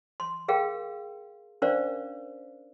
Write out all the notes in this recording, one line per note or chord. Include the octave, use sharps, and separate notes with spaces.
C6
G#4 A#4 F5 G5
C#4 D4 A#4 C5 D5 F5